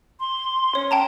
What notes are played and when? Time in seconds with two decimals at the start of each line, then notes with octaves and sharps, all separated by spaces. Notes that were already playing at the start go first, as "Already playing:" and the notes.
0.20 C6
0.75 C#4 C#5
0.91 G5 A5 A#5